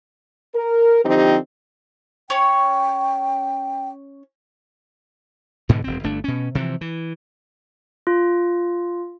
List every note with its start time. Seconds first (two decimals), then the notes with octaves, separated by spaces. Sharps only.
0.54 A#4
1.04 D3 F3 C4 D#4 G4
2.30 C#4 C#5 G5
5.69 G#2 B2 D3 G#3
5.84 D#1 C4
6.04 G1 A3 D4
6.24 B2 C#4
6.55 C3 E3 F3
6.81 E3
8.07 F4